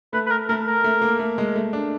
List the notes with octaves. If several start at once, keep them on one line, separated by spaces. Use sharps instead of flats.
A3 B4
B4
A#4
A3 A#4
A#4
A3
A#3
A3
G#3
A3
D4